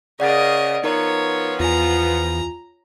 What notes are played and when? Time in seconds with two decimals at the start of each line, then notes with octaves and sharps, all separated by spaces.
0.20 C#3 A#4 D5 D#5 F#5 A6
0.84 F3 B3 D#4 A#4 C#5 A#5
1.60 E2 F4 G#5 A#5